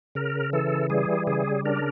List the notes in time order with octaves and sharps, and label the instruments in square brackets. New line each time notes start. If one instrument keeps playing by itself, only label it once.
[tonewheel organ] C#3 A#4
E3 A4
G3 G#4
C#3 G#4
D4 A#4